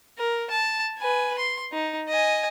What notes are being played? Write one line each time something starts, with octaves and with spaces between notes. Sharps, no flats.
A#4
A5
B4 G#5
C6
D#4
D#5 G#5